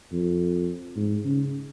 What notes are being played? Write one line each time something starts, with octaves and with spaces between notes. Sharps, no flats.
F2
G#2
C#3